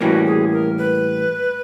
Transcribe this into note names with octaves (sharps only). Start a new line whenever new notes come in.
A2 E3 G3 A#3 C#4 F#4
G#4
A#4
B4